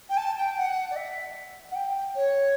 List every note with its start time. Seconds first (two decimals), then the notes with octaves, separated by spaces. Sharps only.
0.10 G5
0.17 A5
0.38 G5
0.58 F#5
0.91 D5
0.96 E5
1.71 F#5
1.75 G5
2.15 C#5